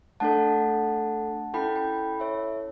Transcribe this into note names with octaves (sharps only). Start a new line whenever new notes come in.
A3 D4 A4 F#5 A5
C#4 E4 A4 G5 B5
G5 B5
C#5 E5